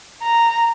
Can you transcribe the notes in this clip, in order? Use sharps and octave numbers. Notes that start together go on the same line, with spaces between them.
A#5